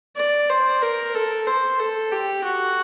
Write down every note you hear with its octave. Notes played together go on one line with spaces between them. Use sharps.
D5
C5
A#4
A4
C5
A4
G4
F#4